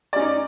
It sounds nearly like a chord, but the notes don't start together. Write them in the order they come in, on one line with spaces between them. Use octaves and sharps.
D5 C#4 D#4